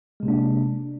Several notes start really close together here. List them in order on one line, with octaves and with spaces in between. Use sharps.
G#3 C3 A#3 D4